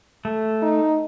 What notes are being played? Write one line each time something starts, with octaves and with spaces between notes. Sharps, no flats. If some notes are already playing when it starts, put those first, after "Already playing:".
A3
D#4